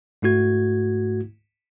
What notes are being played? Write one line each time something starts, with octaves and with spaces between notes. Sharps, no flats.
G#2 A3 E4 F#4 G#6